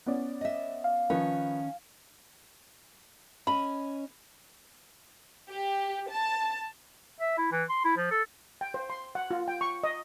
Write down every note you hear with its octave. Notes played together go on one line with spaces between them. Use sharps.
B3 C#4 D5
D#5 E5
F5
D#3 F3 C#4 B4
C#4 D#5 B5
G4
A5
E5
E4
E3
C6
E4
F3
A4
G5
C5
C6
F#5
F4
G5
C#6
D#5